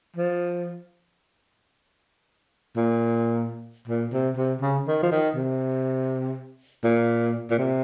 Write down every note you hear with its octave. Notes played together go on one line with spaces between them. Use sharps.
F3
A#2
A#2
C3
C3
C#3
D#3
F3
D#3
C3
A#2
A#2
C3